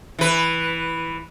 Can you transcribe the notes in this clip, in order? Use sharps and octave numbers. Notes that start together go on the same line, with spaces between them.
E3 B4